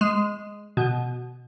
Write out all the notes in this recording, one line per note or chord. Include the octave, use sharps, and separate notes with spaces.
G#3
B2